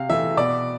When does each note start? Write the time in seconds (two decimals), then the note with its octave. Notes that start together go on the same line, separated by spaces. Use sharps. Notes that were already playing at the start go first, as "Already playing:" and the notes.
Already playing: C3 F5
0.10 E3 A3 E5
0.37 B2 D5